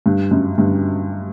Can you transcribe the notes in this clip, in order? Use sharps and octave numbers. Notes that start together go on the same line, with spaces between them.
G2
F#2
G2